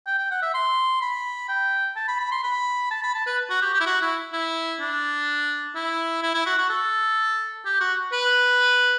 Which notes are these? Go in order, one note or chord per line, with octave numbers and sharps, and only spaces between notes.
G5
G5
F#5
E5
C6
B5
G5
A5
B5
B5
C6
B5
A5
B5
A5
B4
F#4
G4
G4
E4
F#4
E4
E4
D4
E4
E4
E4
F#4
F#4
A4
G4
F#4
B4